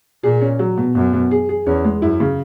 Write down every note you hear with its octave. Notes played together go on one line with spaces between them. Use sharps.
A#2 G#4
C#4
F#3
B2
F#2 B2
B2
G#4
G#4
E2 C#4
G#3
F#2 E4
C#3